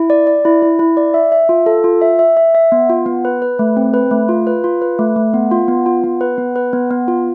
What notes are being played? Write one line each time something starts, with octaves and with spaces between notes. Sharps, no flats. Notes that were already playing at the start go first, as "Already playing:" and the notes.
Already playing: E4
D5
D5
E4
E4
E4
D5
E5
E5
F4
A4
F4
E5
E5
E5
E5
B3
F4
B3
B4
B4
A3
C4
B4
A3
F4
B4
F4
B4
A3
A3
B3
F4
B3
F4
B3
B4
B3
B4
B3
B3
F4